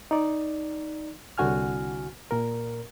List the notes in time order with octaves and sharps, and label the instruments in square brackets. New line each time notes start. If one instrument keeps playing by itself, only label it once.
[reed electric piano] D#4 D5
C2 D3 F#4 G#5 F6
A#2 A#4